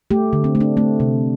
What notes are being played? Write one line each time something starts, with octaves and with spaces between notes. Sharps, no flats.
A3 G4
D3
C4
A3
D4
A3 C4
C3